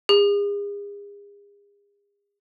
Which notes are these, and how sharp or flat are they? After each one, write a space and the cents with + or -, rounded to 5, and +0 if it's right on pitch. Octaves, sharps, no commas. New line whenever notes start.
G#4 -40